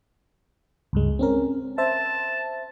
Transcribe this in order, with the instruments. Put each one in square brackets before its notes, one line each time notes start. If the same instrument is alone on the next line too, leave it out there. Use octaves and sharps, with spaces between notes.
[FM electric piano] C#2 G2 G#3
C4 C#4 A#4
[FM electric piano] C5 E5 [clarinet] A5